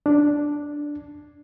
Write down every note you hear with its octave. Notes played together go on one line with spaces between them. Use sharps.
D4